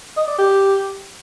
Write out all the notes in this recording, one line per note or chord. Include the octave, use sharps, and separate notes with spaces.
D#5
D5
G4